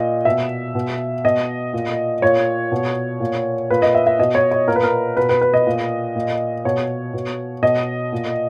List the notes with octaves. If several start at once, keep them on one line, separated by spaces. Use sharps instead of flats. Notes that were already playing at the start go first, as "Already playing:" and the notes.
Already playing: A#2 D#5
B2 E5
B2
B2 D#5
A#2
A#2 C#5
B2
A#2
A#2 B4
D#5
E5
E5
B2 D#5
C#5
C#5
A#2 A#4
B4
A#4
B2 B4
B4
B4
D#5
A#2
A#2
B2 C#5
B2
B2 D#5
A#2